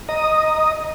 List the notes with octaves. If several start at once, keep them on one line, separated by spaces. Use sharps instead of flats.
D#5 A#5 D#6